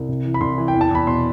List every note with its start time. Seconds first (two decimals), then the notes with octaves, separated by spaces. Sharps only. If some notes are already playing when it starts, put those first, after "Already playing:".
Already playing: C2
0.09 C3
0.25 E3
0.34 B5
0.41 C2 C6
0.58 E3
0.68 G5
0.74 E2
0.81 A5
0.91 E2 B5
1.07 B2 C6